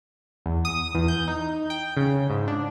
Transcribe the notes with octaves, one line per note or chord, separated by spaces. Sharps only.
E2
D#6
E2
G6
D#4
G5
C#3
G#2
D4